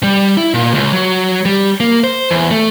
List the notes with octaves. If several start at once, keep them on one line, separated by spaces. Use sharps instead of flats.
G3
E4
A#2
C#2
F#3
G3
A#3
C5
E2
A3